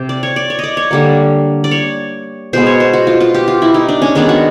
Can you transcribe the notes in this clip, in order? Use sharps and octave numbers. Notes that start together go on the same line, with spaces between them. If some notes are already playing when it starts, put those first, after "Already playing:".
Already playing: C3 G5
D5
C#5
D5
C#5
D5 D#5
C#5
D3 G3 A#3
D5
C#5
B2 G#3 B3 C5
C#5
C5
F#4
F4
F4
G4
F4
E4
D#4
D4
C#4
D#3 G#3 B3 D4
F#4